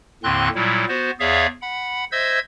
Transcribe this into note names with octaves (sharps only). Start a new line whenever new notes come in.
D#2 A2 D3 C4 C6 F#6
A#2 F#3 G3 E4
B3 F#4 C5
E2 G#4 C#5 D5 E5 F5
F#5 B5
C5 D#5 E5 E6 G#6